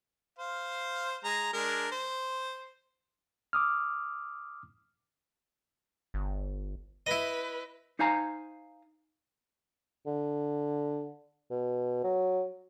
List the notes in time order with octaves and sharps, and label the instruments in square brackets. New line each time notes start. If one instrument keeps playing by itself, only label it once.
[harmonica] C5 F5
G#3 A#5
G#3 D4 A#4
C5
[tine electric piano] D6 D#6 F6
[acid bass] G1
[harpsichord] E4 D#5 [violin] B4
[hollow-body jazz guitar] D#4 C5 F5 G#5 A#5
[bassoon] D3
B2
F#3